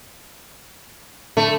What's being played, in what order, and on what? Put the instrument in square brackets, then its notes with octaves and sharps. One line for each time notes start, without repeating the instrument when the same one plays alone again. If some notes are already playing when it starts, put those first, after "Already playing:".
[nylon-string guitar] D3 [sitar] A3